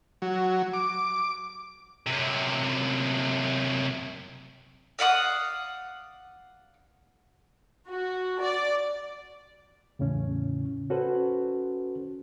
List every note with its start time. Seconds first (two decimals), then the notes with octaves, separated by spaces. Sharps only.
0.22 F#3
0.73 D6
2.07 F#2 C3
4.99 D5 F5 F#5 D#6
7.91 F#4
8.41 D5
9.99 E2 A2 C#3 C#4
10.90 C#4 F#4 A4 B4 C5